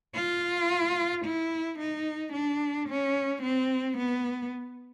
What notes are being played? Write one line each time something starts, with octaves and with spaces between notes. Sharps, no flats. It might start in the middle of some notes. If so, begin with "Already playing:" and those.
F4
E4
D#4
D4
C#4
C4
B3